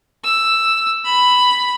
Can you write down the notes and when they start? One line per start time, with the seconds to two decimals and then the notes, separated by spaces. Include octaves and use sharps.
0.24 E6
1.05 B5